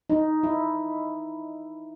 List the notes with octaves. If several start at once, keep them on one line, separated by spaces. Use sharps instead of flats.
D#4
E4